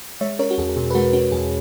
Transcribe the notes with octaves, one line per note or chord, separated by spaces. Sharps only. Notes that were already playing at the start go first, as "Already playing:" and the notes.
G#3 C#5 E5
C#4 A#4 C#5
F#4
E2 G#4
A#4
B2 G#4
B4
G#3 F#4 A#4
C#4 F#4
E2 G#4